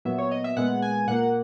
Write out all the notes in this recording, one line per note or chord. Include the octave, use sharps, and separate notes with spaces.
A#2 F#3 B3 E5
C#5
D#5
E5
A#2 G#3 B3 F#5
G#5
A#2 A#3 F#5